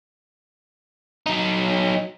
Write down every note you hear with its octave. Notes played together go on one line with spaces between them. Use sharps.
F#3 D#4